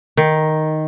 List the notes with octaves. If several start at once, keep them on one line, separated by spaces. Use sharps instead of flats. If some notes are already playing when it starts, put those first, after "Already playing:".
D#3